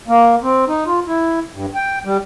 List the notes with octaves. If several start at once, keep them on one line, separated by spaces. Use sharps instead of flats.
A#3
C4
D#4
F4
E4
G2
G5
G3